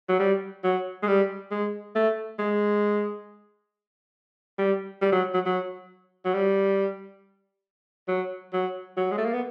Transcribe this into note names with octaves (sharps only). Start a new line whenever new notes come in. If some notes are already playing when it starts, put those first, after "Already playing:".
F#3
G3
F#3
G#3
G3
G#3
A3
G#3
G3
G3
F#3
F#3
F#3
F#3
G3
F#3
F#3
F#3
G#3
A3
A#3
B3